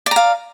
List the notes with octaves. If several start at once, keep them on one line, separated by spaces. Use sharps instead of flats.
D5 F5 A#5